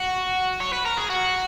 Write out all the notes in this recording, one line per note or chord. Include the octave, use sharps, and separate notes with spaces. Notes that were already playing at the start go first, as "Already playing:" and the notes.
Already playing: F#4
C#5
B4
A#4
G#4
F#4